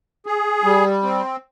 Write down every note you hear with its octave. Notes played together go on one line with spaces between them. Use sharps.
G#4
G3
C4